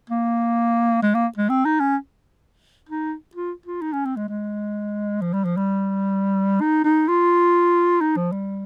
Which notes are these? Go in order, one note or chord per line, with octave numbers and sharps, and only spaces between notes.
A#3
G#3
A#3
G#3
C4
D#4
C#4
D#4
F4
F4
D#4
C#4
C4
G#3
G#3
F3
G3
F3
G3
D#4
D#4
F4
D#4
F3
G3